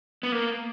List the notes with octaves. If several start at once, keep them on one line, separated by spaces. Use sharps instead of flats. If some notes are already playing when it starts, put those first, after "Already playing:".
B3
A#3